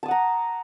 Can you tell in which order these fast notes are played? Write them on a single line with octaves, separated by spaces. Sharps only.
A5 D#6 F#5 A#5